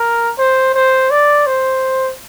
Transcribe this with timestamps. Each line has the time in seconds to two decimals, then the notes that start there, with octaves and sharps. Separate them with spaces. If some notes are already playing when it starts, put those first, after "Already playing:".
Already playing: A#4
0.38 C5
0.75 C5
1.11 D5
1.47 C5